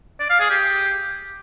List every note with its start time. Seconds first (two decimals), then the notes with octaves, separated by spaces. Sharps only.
0.20 D5
0.30 F5
0.40 G#4
0.50 G4